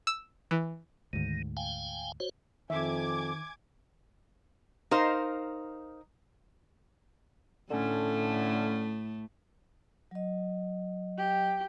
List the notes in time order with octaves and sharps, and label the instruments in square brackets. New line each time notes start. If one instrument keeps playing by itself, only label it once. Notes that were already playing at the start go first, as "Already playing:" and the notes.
[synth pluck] E6
E3
[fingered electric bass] D2 G#2 [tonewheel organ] D#3
[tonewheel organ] F5 G5 G#5
F#4 C5 C#5
[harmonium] F2 [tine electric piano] D#3 [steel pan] E5 [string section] G#5 D6 G#6
[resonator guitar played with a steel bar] D#4 A#4 C5 F5
[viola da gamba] A2 A3 [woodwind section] D3 C#4
[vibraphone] F#3 D#5
[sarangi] G4